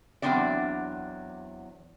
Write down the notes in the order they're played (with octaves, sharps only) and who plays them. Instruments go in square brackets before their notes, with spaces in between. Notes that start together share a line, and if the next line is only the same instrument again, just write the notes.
[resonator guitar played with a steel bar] E2 G#2 F#3 C4 D4 D5